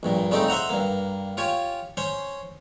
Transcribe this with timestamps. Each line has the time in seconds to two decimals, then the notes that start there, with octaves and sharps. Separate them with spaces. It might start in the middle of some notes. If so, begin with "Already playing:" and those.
0.03 A#1 G2 A#2
0.31 C#3 G3 A3 C4 D#4 G4
0.48 C5 E5 F#5 A#5
0.70 G2 A#3
1.37 F4 G4 C#5 G#5
1.97 C#4 C5 C#5